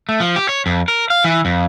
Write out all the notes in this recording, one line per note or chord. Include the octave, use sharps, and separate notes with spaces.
A3
F3
G4
C#5
F2
A#4
F5
E3
F2